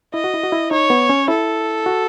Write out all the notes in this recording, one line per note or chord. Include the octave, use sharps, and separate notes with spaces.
E4 D#5
F#4
E4
F#4
E4
D#4 C#5
B3
C#4
E4 A4
F#4